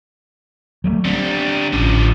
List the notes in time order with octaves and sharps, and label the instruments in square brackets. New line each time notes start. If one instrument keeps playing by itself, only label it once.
[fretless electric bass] F#3 G3 A3
[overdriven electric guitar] D3 G3 [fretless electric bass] C4
[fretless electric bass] A1 C#4 [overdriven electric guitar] D3 F3